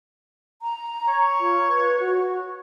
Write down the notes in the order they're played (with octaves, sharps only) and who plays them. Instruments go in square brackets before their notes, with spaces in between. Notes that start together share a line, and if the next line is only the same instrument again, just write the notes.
[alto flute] A#5
[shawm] C#5
[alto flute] F4
B4
F#4